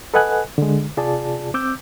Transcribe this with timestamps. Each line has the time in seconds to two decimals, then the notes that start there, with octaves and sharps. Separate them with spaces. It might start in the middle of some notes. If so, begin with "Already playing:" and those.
0.14 A4 B4 D#5 F#5 G#5 F#6
0.58 D3 G#3
0.97 C3 F4 G#4 D5 A5
1.54 C4 D6 E6 G6